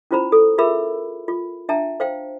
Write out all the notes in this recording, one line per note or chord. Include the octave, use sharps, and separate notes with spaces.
C#4 E4 F4 C5 A#5 B5
A4
F4 G#4 A#4 E5 B5 E6
F4
D4 E5 G5 A5 A#5
C5 F5 G5